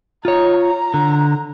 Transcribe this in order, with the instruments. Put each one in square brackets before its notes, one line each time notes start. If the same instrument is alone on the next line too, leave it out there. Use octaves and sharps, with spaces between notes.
[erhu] D#4 [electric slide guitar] F4 C#5
[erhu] A#5
[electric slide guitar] D3